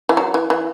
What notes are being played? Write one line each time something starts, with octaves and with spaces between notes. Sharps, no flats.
E3
F#3
E3
E3